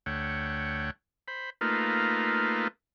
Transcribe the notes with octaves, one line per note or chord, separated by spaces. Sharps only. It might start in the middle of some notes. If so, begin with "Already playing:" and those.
D2 A3 C#5 F#5 G5
C5 B5
A3 A#3 D#4 F4 B4